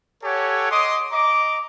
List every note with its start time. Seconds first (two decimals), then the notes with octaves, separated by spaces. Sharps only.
0.23 G4 A4 C#5 F#5 G#5
0.70 D#5 C6 D6 D#6
1.12 D#5 A#5 D6